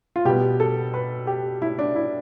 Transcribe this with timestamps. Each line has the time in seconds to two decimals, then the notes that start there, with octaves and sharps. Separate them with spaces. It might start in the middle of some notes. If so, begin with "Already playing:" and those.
0.16 F4
0.25 B2 G3 B3 G4
0.60 A4
0.94 B4
1.27 G4
1.62 E4
1.79 D4
1.96 E4